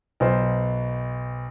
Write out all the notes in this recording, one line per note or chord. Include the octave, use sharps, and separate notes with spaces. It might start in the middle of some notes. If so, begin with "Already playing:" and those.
B1 B3 C5